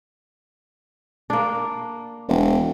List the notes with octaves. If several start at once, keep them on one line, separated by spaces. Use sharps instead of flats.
A#3 D4
E1